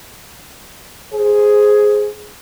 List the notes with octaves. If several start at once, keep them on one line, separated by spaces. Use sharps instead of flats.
G#4 C5